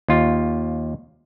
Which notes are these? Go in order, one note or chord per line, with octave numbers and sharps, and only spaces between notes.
D#2 F4